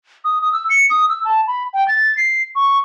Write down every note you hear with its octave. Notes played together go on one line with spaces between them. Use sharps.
D#6
D#6
E6
C#7
D#6
E6
A5
B5
G5
A6
C7
C#6